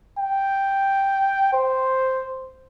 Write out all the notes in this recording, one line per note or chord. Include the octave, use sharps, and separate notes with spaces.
G5
C5